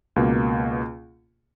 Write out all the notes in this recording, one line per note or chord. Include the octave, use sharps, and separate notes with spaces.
C#2 B2 A#3